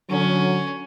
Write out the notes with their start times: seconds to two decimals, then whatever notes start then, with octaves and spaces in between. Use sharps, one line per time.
0.09 D3 F#3 C#4